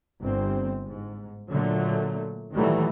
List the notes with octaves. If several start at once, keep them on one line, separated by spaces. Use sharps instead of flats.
G1 C4
G#2
A#2 D3 F#3 A3
A#2 D#3 E3 F#3 G3 A3